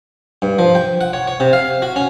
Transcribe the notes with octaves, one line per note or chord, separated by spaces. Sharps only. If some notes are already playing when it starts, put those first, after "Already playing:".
G2
F3
G5
F#5
C#5
C#5
C3
F5
F#4
C#4